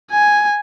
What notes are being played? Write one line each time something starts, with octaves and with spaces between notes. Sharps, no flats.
G#5